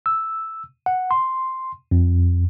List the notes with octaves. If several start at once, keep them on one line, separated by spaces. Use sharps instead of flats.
E6
F#5
C6
F2